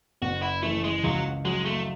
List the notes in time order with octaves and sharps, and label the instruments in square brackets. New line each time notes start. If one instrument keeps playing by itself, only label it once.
[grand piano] F#1 [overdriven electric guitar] F#4
[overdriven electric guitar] E4
[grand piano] E3 [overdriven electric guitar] A3
[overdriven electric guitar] G#3
[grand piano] C#2 [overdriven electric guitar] F#3
[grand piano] F#3 [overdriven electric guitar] G#3
[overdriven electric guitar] A3